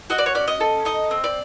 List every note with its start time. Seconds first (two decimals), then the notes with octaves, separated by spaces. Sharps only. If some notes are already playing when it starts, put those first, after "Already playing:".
0.10 F#4 D#5
0.18 D5
0.26 C#5
0.35 C#4 D5
0.48 D#5
0.60 A4
0.85 D#4 D#5
1.11 C4
1.24 D5